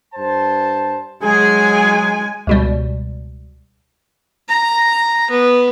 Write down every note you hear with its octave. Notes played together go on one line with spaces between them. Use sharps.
G2 C5 A5
F#3 G#3 G#4 G#5
C#2 B2 G3
A#5
B3